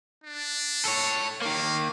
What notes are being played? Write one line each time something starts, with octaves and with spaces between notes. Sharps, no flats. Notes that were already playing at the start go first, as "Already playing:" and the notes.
D4
A4 C#5
D#3 A#3 F5